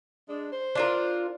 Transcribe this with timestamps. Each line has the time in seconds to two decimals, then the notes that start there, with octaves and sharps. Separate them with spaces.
0.28 G#3 D4
0.52 C5
0.75 D4 F4 A#4